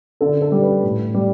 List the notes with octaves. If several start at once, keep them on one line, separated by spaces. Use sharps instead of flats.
D3 A4
A4
G3
B4
A2
G3